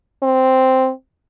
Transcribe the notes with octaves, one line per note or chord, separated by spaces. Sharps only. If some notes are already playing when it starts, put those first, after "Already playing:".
C4